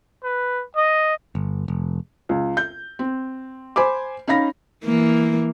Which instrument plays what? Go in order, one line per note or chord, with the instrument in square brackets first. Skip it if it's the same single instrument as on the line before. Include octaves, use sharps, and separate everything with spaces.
[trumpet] B4
D#5
[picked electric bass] G1
F1
[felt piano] C#2
G6
C4
C5 G#5 B5 D6
C#4 D#4 F5 B5 A#6
[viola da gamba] E3 A#3